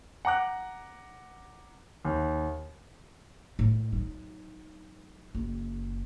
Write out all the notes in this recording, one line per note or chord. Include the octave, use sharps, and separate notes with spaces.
F#5 A#5 D6 F#6
D#2
A2
F#3 D#4
F#1